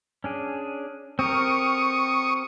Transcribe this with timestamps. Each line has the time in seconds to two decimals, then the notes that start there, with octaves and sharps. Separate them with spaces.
0.24 C#4 D4 G#4
1.19 C4 G4 A#4 C#6 D#6